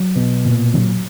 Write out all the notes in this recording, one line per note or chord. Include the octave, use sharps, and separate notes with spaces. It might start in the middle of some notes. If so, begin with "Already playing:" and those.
Already playing: F#3
B2
A#2
F#3